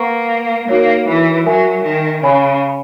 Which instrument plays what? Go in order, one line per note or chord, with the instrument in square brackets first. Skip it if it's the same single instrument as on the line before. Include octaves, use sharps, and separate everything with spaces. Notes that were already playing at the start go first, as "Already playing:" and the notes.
Already playing: [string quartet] A#3 [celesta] B4 F#5 A#5 C#6
[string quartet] A#3 [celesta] D#4 F#4 A#4 C#5
[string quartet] E3
[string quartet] F#3 [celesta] A#4 E5 G#5
[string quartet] D#3
[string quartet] C#3 [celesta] C#5 G#5 B5